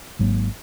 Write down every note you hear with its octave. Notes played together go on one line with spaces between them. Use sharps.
G#1 G#2 F#3 A#3